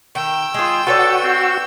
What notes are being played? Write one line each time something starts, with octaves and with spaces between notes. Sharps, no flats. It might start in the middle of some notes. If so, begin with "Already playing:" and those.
D#3 G5 E6
G#3 F4 G#4
F#4 A4 B4 C#5 D5 F#5 C#6
C4